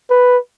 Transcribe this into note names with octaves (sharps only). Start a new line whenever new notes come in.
B4